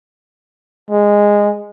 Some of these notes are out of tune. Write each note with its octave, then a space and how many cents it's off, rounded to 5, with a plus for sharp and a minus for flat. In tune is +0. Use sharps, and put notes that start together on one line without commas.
G#3 -15